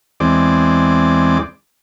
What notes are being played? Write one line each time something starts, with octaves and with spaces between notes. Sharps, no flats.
E2 G#3 C4 D5